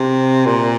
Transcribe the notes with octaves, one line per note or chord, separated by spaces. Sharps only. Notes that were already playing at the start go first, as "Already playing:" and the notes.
Already playing: C3
A#2